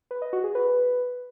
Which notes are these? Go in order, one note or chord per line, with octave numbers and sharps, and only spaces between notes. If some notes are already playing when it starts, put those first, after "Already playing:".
B4
D#5
F#4
G#4
B4